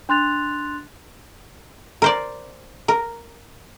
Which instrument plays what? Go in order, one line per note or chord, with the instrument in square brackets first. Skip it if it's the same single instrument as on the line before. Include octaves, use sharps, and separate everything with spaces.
[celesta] D4 C6 F#6 A6 F7
[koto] A#4 C5 D5
A#4